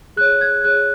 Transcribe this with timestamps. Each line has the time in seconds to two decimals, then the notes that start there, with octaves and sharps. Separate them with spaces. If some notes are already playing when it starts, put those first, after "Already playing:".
0.17 G#4 F#6
0.21 C#5
0.41 G#6
0.64 G#4 C#5 F#6